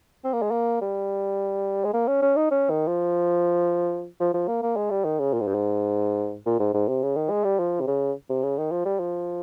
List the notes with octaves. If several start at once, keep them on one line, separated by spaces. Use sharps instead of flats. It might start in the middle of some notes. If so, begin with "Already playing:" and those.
C4
A#3
G#3
A#3
G3
G#3
A#3
C#4
C#4
D#4
C#4
D#3
F3
F3
F3
A#3
A#3
G#3
G3
D#3
C#3
A#2
G#2
G2
G#2
A#2
G#2
G#2
C3
C#3
D#3
G#3
G3
F3
C3
C#3
C3
C#3
D#3
F3
G3
F3